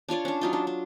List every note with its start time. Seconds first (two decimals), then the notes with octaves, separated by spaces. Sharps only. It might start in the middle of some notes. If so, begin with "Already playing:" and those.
0.09 D4 F4 C#5 D5
0.25 C#4 D4
0.41 F#3 D#4 F4
0.53 D4
0.67 D4